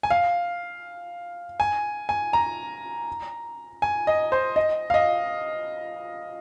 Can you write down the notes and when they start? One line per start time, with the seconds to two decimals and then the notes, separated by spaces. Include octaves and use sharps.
0.03 G#5
0.10 F5
1.60 G#5
2.09 G#5
2.33 A#5
3.82 G#5
4.07 D#5
4.32 C5
4.56 D#5
4.90 F5
4.94 D#5